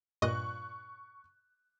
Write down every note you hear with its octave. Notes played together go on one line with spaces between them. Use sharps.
G2 A#2 D#5 C#6 F#6